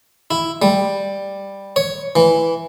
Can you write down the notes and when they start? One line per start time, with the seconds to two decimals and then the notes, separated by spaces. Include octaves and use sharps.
0.31 E4
0.62 G3
1.76 C#5
2.16 E3